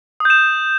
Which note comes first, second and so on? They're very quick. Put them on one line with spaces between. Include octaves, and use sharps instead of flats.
D#6 G6 E7